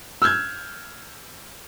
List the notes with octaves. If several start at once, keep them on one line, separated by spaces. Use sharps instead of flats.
E6 F6 G6 G#6